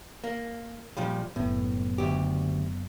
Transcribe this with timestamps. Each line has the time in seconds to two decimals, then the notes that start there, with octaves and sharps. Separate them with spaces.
0.24 A#3
0.97 A#2 F3 G3
1.36 F#1 A2 B3
1.98 D2 G4